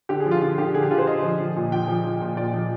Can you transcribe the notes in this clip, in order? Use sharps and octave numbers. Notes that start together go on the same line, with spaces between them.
D3 G4
G#4
F3
F4
D3 F4
D3 G4
D3 G#4
G4
D3 F4
C5
D3 D#5
F3
F3
A#2
F3 G5
F3
F3
A#2
A#2 D5
F3